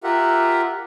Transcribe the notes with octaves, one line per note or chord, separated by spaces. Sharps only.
F4 G4 A#4 E5 F#5